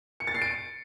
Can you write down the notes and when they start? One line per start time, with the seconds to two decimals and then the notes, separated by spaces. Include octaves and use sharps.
0.20 C#7
0.27 A6
0.34 C7
0.42 D7